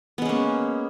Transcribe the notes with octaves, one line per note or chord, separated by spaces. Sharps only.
G#3 A#3 B3 C#4